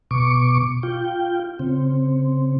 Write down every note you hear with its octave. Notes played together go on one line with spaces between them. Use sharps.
B2 C#6 D6
F4 G5
C#3 C4